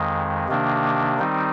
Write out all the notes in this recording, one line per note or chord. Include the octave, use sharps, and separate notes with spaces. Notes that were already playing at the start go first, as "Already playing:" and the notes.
Already playing: F2 D#3 G#3
C3 D#3 A#3 D4
D#3 G3 C4 D#4